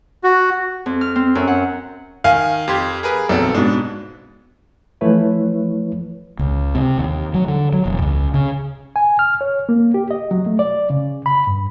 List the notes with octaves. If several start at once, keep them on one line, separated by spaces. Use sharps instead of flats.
F#4
F2
F6
C4
F#2
F#5
D#3 F5 G#5
F2 G4 C6 G#6
G#4 A#4 B4
B1 C4 A4
G#2 B2 D4
E3 F3 A3 E4 B4 C#5
C#2
C3
D#2
F#3
D3
F#3
E1
C#2
C#3
G#5
F6
C#5
A#3
G4
D#5
F#3
A3
D5
C#3
B5
G2